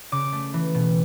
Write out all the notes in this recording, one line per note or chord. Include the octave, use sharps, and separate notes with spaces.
C#3 D6
A3
E3
B2